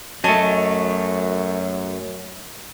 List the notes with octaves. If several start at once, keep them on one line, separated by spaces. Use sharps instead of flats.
F#2 F#3 A3 D#5 G#5 A5